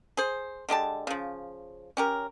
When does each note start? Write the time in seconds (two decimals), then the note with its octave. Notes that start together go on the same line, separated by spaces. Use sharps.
0.17 G#4 C5
0.69 D3 G#3 G4 A5
1.07 C#3 F3
1.97 C#4 G4 A#4